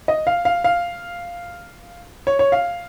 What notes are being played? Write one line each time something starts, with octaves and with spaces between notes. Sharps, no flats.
D#5
F5
F5
F5
C#5
C#5
F5